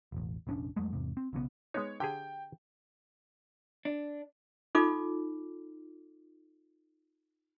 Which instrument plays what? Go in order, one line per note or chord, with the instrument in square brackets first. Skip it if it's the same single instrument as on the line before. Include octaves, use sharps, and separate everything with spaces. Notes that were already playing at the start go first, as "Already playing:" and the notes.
[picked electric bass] E1 A1
F1 A#1 C#4 D4
F2 F#3 G#3 A3
E2 G#2 C3
C4
B1 C#3 F3 B3
[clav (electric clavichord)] G#3 B3 D#4 [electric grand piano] C#5
[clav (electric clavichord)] D3 G4 G#4 [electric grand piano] G5
[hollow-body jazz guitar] D4
[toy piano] D#4 F4 A4 D6